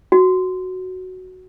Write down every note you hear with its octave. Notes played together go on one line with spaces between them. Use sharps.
F#4